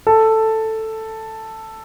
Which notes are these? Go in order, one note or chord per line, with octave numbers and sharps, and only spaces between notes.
A4